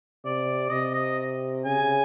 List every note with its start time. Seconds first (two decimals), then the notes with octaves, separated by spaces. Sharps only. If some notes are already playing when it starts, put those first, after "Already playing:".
0.25 C3 D5
0.72 C3 D#5
0.95 D#5
1.65 C#3 G#5